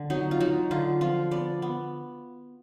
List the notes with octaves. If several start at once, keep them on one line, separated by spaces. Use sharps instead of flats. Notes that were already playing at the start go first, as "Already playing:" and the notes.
Already playing: D3
F#3 D#4
F4
F#3 D#4
D3 F4
F3 F4
B3 D5
B3